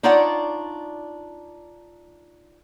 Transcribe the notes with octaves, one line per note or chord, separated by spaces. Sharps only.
D4 D#4 F4 C#5 D5 F#5